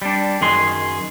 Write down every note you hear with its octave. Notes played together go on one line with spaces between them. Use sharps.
G3 D4
F#2 D#3 G#4 C6